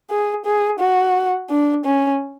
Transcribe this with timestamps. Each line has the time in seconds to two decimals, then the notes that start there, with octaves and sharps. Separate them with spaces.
0.10 G#4
0.45 G#4
0.80 F#4
1.50 D4
1.85 C#4